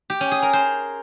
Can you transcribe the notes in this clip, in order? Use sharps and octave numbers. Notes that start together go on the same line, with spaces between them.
G4
C#4
G#4
A#4
C5